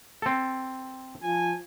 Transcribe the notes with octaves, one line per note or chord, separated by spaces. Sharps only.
C4 A4
F3 G#5